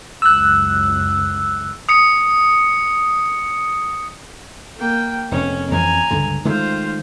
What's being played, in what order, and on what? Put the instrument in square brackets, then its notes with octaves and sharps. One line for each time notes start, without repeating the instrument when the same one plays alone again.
[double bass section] C#2 F#2 [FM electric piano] E6 F#6
[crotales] D#6 C#7
[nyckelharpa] A#3 G5
[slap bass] F1 [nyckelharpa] C#4
[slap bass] F2 E3 F3 [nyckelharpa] G#5 A#5
[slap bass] C#2 G2 D3
[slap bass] D#3 G#3 A3 [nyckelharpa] F4 C5